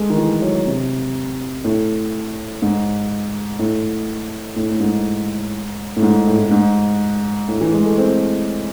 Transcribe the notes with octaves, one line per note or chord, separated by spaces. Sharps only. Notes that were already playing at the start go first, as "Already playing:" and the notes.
Already playing: G#3 A3
D#3
E3
F#3
C3
A2
G#2
A2
A2
A2
G#2
A2
G#2
A2
A2
G#2
A2
E3
G#3
A3
C4